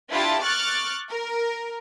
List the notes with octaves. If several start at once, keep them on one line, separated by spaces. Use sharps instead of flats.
D4 E4 F4 G4 A5
C#6 D6 F6 F#6 A6
A#4